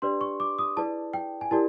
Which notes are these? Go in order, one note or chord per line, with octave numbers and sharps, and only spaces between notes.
D4 G4 B4 D5 C6
C#6
D6
D#6
E4 G#4 B4 D5 A5
G5
G#5
E4 G4 A#4 D5 A5